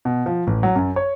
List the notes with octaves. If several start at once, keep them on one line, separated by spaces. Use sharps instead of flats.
B2
F3
A1
F#3
F#2
C#5